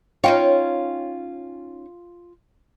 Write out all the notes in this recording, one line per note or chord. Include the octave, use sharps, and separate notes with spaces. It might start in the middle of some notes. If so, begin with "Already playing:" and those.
C#4 D#4 F4 C#5 F5 G5